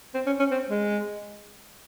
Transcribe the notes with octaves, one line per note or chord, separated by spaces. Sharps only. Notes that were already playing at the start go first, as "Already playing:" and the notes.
C4
C#4
C#4
C4
G#3